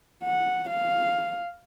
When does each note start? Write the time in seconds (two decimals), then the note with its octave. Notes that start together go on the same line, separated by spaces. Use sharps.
0.24 F#5
0.70 F5